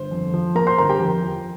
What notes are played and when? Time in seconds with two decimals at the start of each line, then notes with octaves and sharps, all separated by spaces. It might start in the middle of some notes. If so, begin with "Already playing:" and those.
Already playing: G1 C5
0.11 F2
0.34 F3
0.55 A#3 A#4 A#5
0.67 C5 C6
0.78 G1 A#4 A#5
0.89 G4 G5
1.00 F2
1.23 F3